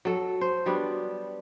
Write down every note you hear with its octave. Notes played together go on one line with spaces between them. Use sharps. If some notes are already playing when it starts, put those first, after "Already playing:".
F#3 A4
C5
F#3 G3 B3 D4